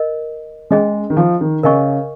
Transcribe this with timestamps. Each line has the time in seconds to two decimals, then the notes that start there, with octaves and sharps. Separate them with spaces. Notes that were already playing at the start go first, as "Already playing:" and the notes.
Already playing: A#4 D#5
0.71 G#3 C#4 G#4 D#5
1.10 D#3
1.17 F3
1.41 D#3
1.63 C#3 A#4 D#5 G#5 C#6